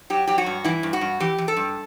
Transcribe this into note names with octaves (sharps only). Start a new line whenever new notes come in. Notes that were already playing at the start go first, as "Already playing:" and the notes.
F#3 G4
F#3 G4
F#4
G2
E3 E4
G2
F#4
G2
E3 G4
E3
A4
G2